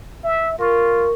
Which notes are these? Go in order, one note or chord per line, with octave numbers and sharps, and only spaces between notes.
E5
F4 A#4 C#6